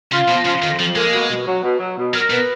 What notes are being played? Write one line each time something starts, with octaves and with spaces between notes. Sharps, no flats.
C#3 F4
B2 F3
C#3 F4
F2 D#3
F2 F3
G#3 A#3
B2
B2
F#3
B2
F#3
B2
F#3 A#4
B2 B3